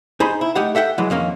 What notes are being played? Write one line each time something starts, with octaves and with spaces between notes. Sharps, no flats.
D#4 G#4 C5 B5
E4
A3 D#4 G4 F#5
A4 E5 F#5 G5
E3 F#3 G#3
F2 D#3 A#3 C#4